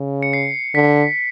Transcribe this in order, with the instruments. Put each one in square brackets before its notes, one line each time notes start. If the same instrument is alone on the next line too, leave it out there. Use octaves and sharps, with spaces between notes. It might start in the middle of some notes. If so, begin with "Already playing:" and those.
Already playing: [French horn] C#3
[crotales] C#7
C7
[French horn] D3 [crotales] B6